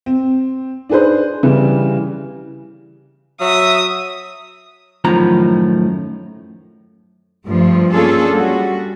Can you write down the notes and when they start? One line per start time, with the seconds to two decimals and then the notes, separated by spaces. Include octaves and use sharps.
0.06 C4
0.89 D4 D#4 G#4 B4 C5
1.43 C#3 E3 G3
3.41 F#3 E5 D#6
5.05 F#2 A2 D#3 F3 A#5
7.46 G2 F3 A3
7.92 A#3 C#4 D4 F4 G#4 A4
8.33 G3 F#4